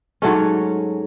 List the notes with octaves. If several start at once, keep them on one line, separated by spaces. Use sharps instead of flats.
G#2 F#3 A3 C#4